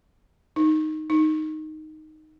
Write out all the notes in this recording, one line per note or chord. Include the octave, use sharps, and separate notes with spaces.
D#4
D#4